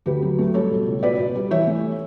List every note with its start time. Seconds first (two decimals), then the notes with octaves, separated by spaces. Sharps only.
0.06 D2 G4 B4
0.22 F#3
0.39 A3
0.54 G3 A4 C#5
0.71 B2
0.87 C#2
1.03 B2 B4 D5
1.18 B2
1.35 G3
1.51 E3 C#5 E5
1.67 A3